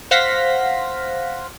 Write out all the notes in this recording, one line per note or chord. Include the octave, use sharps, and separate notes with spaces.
C5 F5 F#5 C6 A#6 B6